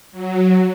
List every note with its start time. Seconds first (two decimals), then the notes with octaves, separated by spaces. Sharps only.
0.12 F#3